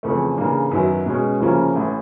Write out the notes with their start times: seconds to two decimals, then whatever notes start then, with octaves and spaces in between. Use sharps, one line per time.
0.03 F2 C#3 E3 A3
0.37 C#3 E3 G3 A#3 D4
0.71 F#2 D#3 F#3 B3 E4
1.06 B2 G#3 C#4
1.40 D2 C#3 F3 A#3 C#4
1.75 A1 A2 E3